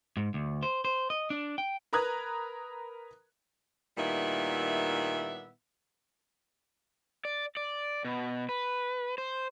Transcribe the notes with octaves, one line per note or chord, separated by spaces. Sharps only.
G#2
D2
C5
C5
D#5
D4
G5
A#4 B4 A#5 D#6 F#6 G#6
A#2 D#3 G3 B3 E4 E5
D5
D5
B2
B4
C5